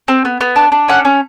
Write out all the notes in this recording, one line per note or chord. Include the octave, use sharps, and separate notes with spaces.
C4
B3
B3
D4
D4
C#4 F#5
C#4